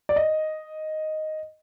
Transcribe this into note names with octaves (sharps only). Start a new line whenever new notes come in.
D5
D#5